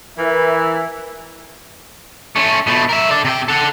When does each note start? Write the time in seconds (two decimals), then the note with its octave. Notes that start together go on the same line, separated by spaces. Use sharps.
0.17 E3 A#4 E5
2.36 A3 C#4
2.67 B2 A3
2.89 A#4 E5
3.11 A4 D5
3.25 C3 G5
3.48 A4 F#5